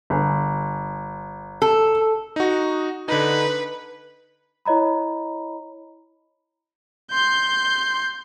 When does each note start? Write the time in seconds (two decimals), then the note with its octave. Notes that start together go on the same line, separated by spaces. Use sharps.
0.10 G1
1.62 A4
2.36 D#4 F#4
3.08 D3 D#4 B4
4.65 E4 C#5 D#5 A#5 B5
7.12 C6 G6